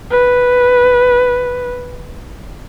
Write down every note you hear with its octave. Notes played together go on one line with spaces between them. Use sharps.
B4